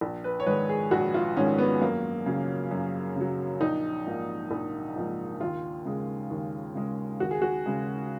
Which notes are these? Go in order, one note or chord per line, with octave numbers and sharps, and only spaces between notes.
A#1
B4
C#5
G#2 D#3 G#3 B4
G#4
A#1 F#4
F4
G#2 D#3 G#3 C#4
B3
F#2 A#3
C#3 F#3
F#2
C#3 F#3
A#1 D#4
G#2 F3 A#3
A#1
G#2 F3 A#3
D#2 F4
C#3 G#3
D#2
C#3 G#3
D#2 F#4
G#4
F#4
C#3 G#3